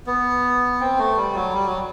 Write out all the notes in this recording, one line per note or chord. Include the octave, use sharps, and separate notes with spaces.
B3
C4
A3
G3
F#3
G3
F#3